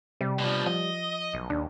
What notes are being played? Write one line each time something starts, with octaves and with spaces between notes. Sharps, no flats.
C3 G3
B2 F3
F3 D#5
B1
D#2 D4